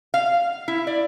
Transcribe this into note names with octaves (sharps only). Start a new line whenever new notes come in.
F5
E4
D5